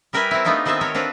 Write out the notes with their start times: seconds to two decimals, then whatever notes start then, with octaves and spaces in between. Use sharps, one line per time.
0.13 G3 G4 A#4 B4 E5 G#5
0.31 C4 E4
0.45 A3 B3 D4 D#4 F4 A4
0.65 D#3 B3 C4 D#5 E5 A5
0.81 A4 A#4 C#5
0.95 C4 D4 F4 B4